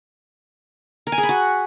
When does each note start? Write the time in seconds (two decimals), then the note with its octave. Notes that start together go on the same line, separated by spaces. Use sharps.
1.07 A#4
1.12 G#5
1.18 G#4
1.23 B5
1.29 F#4